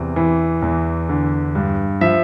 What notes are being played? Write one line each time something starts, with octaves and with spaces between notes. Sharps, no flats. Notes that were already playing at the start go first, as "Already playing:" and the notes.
Already playing: E2 C3
E3
E2
D3
G2
F3 E5